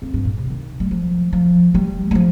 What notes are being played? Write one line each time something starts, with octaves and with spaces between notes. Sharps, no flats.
F2
G2
A#2
C3
D#3
G3
F3
F3
G3
G3
F3